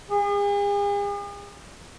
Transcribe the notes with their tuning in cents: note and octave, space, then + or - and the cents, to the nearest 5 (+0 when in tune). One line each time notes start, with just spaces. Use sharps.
G#4 -45